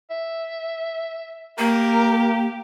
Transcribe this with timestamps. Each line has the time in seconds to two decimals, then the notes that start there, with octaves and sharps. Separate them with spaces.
0.10 E5
1.59 A#3 G4 A#4